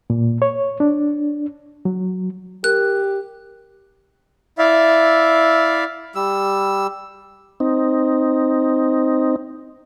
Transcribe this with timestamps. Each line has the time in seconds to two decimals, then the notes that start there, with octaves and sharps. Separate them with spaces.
0.10 A#2
0.42 C#5
0.80 D4
1.85 F#3
2.64 G4 A#4 F#6
4.58 E4 D5 E5 F5
6.15 G3 E6
7.60 C4 D#4